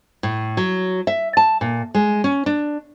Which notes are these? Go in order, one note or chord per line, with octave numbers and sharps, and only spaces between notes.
A2
F#3
E5
A5
A#2
G#3
C#4
D4